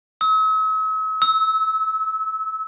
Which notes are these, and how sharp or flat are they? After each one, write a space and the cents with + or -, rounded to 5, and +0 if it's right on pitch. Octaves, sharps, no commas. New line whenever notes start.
E6 -45
E6 -25